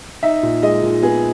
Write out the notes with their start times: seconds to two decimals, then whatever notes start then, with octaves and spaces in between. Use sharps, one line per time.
0.23 D#4 E5
0.43 A#2
0.62 G#3 D#5
0.83 A#2
1.02 B3 G#4